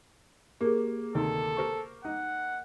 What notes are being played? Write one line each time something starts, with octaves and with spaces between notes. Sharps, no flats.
A#3 G4 G#4
D2 C3 D#3 A4
A#4 C5 C#6
D#4 D#5 F#5